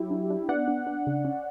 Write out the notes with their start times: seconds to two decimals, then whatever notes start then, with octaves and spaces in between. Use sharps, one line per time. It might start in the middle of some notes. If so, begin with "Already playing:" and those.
Already playing: F#3 E4 G4
0.11 D4
0.30 D4
0.49 B3 D5 F#5
0.68 D4
0.87 D4
1.07 C#3
1.25 C#4